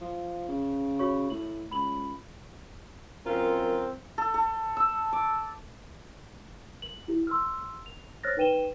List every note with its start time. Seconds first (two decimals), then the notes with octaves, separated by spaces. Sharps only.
0.01 F3
0.48 C#3
0.99 F#4 C#5 C#6
1.30 A2 F#7
1.71 C#2 B5 F#7
3.26 F#2 C4 F4 A#4
4.18 A4
4.34 A4
4.77 E6
5.13 D6
6.82 F#7
7.08 E4 G4
7.27 C6 E6 F6
7.86 F7
8.24 C5 C#5 F6 F#6 A6 A#6
8.37 D#4 B4 G5 D#7 E7 G7